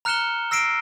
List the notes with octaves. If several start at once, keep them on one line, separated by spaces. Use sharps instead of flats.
A#5 F6 F#6 C#7 E7 G7
E6 A#6 C7 D7 E7